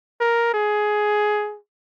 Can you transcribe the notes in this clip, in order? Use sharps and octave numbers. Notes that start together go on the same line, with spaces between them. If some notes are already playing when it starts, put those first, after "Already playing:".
A#4
G#4